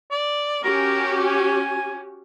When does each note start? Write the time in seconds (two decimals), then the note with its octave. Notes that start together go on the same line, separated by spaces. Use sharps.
0.11 D5
0.63 C#4 F#4 G4 A#4
1.26 G#5